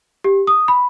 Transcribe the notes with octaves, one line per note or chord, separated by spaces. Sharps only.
G4
D#6
B5